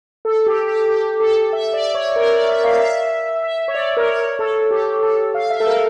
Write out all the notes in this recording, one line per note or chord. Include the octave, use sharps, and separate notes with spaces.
A4
G4
G4
G4
A4
E5
D5
C#5
A#4
D5
E5
F5
E5
E5
C#5
D5
A#4
C#5
A4
G4
A4
F5
E5
A4
A#4